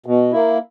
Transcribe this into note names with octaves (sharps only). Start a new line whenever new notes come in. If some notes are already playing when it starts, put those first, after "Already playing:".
B2
A#3 E4